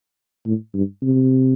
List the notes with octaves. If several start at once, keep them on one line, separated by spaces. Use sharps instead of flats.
A2
G2
C3